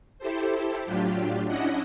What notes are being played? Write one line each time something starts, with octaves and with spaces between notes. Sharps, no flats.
E4 G4 A4 C5
A2 F#3 D4 F4 G4
C#4 D4 E4 D#5 F#5